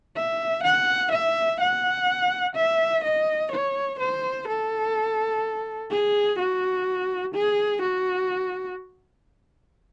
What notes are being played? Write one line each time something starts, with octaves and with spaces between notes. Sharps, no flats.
E5
F#5
E5
F#5
E5
D#5
C#5
C5
A4
G#4
F#4
G#4
F#4